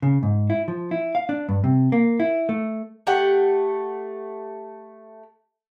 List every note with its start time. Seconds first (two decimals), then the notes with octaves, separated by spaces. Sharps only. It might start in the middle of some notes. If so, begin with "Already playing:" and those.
0.02 C#3
0.23 G#2
0.50 E4
0.68 F3
0.91 E4
1.15 F5
1.29 D4
1.49 G2
1.64 C3
1.92 A#3
2.20 E4
2.49 A3
3.07 A3 G4 F#5